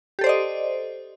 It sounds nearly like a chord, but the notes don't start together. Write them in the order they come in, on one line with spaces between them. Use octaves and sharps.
G4 A4 C5 D5 D#5